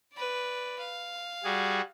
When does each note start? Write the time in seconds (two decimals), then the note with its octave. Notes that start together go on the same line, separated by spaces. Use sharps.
0.13 B4 D5
0.79 F5
1.44 G3 F#4 G#4